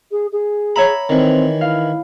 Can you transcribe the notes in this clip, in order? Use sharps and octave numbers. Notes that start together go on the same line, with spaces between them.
G#4
G#4
C#5 E5 A#5 B5
D#3 E3 C4
E4 F5